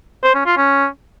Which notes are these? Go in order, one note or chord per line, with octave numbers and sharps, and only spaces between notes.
C5
C#4
F4
C#4